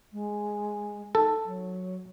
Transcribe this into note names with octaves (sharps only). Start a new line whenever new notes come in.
G#3
D#4 A4
F#3